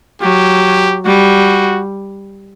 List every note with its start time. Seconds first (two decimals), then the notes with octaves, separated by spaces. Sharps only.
0.21 F#3 G4
1.05 G3 F#4